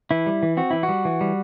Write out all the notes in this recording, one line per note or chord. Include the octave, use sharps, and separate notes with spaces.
E3 E4
G3
E3
C4 F#4
E3 E4
F#4
G3
E3
G3